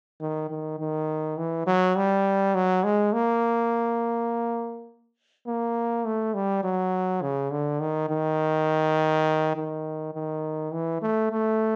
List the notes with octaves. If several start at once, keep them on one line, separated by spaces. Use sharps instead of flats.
D#3
D#3
D#3
E3
F#3
G3
F#3
G#3
A#3
A#3
A3
G3
F#3
C#3
D3
D#3
D#3
D#3
D#3
E3
A3
A3